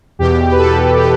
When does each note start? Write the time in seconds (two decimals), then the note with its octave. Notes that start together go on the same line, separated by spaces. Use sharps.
0.19 E2 B2 G4
0.52 B4
0.58 A4
0.98 G4